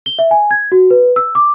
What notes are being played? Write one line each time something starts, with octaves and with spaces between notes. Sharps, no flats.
G7
E5
G#5
G#6
F#4
B4
E6
D6